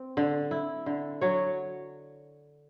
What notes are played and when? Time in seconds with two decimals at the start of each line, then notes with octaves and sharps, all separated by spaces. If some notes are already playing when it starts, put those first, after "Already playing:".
Already playing: C4
0.17 D3
0.51 E4
0.86 D3
1.21 F#3 C#5